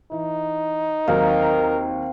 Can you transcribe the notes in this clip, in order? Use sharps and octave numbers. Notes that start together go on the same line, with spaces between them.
E3 D#4
D#2 F#3 C4 A#4 F5